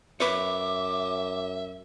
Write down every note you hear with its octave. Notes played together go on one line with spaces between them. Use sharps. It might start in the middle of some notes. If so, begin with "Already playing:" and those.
F#2 B4 C#5 E5 D6